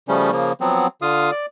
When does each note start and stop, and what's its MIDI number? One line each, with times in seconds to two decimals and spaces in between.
0.08 0.31 49
0.08 0.31 53
0.08 0.31 55
0.08 0.31 57
0.08 0.31 61
0.32 0.53 49
0.32 0.53 53
0.32 0.53 58
0.61 0.87 53
0.61 0.87 54
0.61 0.87 59
0.61 0.87 60
1.02 1.31 50
1.02 1.31 65
1.02 1.31 77
1.02 1.31 87
1.32 1.46 74